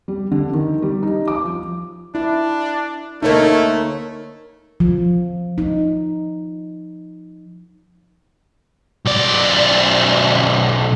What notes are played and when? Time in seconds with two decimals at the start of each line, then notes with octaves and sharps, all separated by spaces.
0.08 G3
0.31 D3
0.53 D#3
0.82 G3
1.03 D#4
1.28 D6
1.45 F3
2.15 D4 E4
3.23 D2 A3 A#3 D#4 C#5
4.80 F3
5.58 D#4
9.05 B1 D5